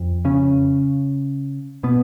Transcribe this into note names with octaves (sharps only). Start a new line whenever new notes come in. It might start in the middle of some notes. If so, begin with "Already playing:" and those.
Already playing: F2
C#3 C#4
B2 B3